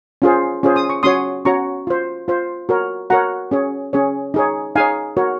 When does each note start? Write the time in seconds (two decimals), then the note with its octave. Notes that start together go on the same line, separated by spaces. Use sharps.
0.22 C#4 F4 G#4 C5
0.63 C#4 F4 G#4 C5
0.76 D#6
0.89 C#6
1.03 C#4 F#4 C#5 C6 D#6
1.45 C#4 F#4 C#5 A#5 C#6
1.87 F4 C5
2.28 F4 C5
2.69 F#4 A#4 C#5
3.10 F#4 A#4 C#5 F#5 A#5
3.51 C#4 G#4 C#5
3.93 C#4 G#4 C#5
4.34 D#4 G#4 C#5
4.76 D#4 G#4 C#5 F5 G#5
5.17 F#4 A#4 C#5